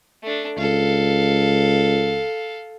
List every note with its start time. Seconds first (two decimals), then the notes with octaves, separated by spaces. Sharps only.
0.23 A3 D4
0.58 C#2 A4 F5